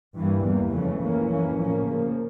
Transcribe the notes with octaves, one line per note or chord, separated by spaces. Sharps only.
G2 E3 G3 A#3
E2 E3 G3 A#3
F2 C#3 E3 A3 C#4
F2 E3 A#3 C#4
F2 E3 A#3 C#4
A2 F3 A#3 C#4
C#3 F3 A#3